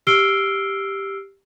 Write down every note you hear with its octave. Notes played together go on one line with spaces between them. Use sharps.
G4 E6 F6 C7 D7 G7